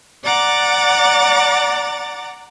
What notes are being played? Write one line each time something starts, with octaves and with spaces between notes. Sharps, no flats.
D5 F#5 A#5 D6 A6